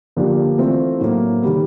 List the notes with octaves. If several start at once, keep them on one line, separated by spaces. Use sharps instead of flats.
D3 F3 A#3 D4 G4
E3 A3 C4 F4
A2 F#3 A#3
D#3 G3 B3